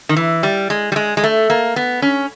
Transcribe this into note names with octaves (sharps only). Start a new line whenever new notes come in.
D#3
E3
G3
G#3
G3
G#3
G#3
A3
A#3
B3
C#4